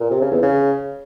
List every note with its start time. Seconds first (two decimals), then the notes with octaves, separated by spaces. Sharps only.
0.01 A#2
0.11 C3
0.21 C#3
0.32 E2
0.42 C#3